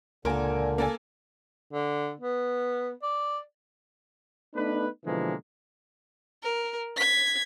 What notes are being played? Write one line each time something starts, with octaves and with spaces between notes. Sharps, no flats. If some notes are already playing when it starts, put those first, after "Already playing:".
C#2 A#2 D3 A#3 A4 A#4 G#5
A#3 A4 G#5
D3
B3
D5
A3 B3 D4 D#4 B4
B2 D3 E3 F3 G#3 A#3
A#4
G#6 B6